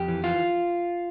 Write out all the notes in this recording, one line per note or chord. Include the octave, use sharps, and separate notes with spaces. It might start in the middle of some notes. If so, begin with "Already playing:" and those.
Already playing: F2 G4
E3
E3 F4